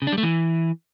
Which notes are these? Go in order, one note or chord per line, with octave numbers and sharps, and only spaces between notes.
C#3
D4
G3
A3
E3